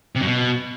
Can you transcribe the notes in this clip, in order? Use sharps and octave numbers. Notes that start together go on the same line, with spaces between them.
C3
F#2
B2